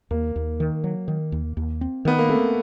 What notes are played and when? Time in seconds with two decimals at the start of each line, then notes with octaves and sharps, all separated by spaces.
0.11 D#2 A#3
0.36 D#2
0.60 D#3
0.84 F#3
1.08 D#3
1.32 D#2
1.57 D#2
1.81 C4
2.05 D#3 B3
2.19 A#3
2.29 A3 C4